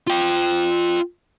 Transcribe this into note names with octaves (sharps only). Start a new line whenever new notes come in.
F4 G5